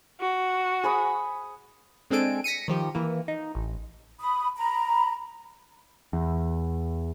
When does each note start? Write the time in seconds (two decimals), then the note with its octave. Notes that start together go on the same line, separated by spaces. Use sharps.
0.20 F#4
0.83 G#4 B5 D#6
2.11 G#3 C4 D4 A4 G#5 D7
2.44 A#6 B6 C#7 D#7
2.68 D#3 F3 G4
2.95 E3 A#3
3.28 D#4
3.55 A1
4.20 B5 D#6
4.57 A#5 B5
6.13 E2